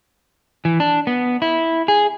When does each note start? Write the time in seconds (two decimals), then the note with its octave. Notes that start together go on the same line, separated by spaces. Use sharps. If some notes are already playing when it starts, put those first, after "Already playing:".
0.65 E3
0.80 D4
1.07 B3
1.42 E4
1.88 G#4